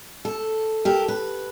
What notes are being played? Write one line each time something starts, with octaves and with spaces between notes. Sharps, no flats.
A4
G4 A4 A#4
B4